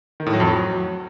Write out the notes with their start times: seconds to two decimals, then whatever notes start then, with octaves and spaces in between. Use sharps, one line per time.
0.20 D#3
0.26 A2
0.33 F#3
0.40 F2
0.47 F#3